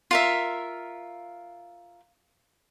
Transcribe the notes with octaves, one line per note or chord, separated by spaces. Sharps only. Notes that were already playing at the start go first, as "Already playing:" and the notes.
F4 A#4 E5